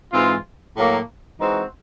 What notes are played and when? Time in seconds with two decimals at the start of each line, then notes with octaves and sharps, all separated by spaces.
0.13 G#2 E3 G#3 C4 F4
0.76 A2 F#3 A#3
1.40 E3 G#3 C4 D#4 F#4